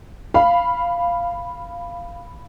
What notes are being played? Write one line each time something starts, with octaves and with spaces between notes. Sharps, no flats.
F5 B5